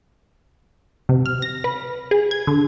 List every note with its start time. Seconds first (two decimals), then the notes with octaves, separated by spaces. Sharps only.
1.09 C3
1.26 F6
1.42 A#6
1.64 B4
2.11 G#4
2.31 G#6
2.47 D3